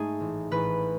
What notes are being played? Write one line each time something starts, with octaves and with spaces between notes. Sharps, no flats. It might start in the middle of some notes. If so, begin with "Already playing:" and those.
Already playing: G#2 A3 D#4 G#4
A1
A1 B4